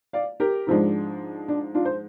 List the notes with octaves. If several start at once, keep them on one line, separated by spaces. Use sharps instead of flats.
D5 F5
G4 A#4
G#2 F3 G#3 D4
D4
D4 F4
C5